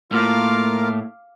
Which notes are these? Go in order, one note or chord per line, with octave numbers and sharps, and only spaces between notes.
A2 A#3 F4 A#4 F5 D6